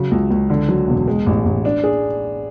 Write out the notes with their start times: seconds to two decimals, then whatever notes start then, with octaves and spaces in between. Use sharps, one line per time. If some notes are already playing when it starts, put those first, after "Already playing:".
Already playing: C#3 F#3
0.11 C#2
0.30 C#2
0.50 D3
0.69 F#3
0.88 E1
1.08 G#3
1.26 A1
1.45 A1
1.65 D4
1.84 G#4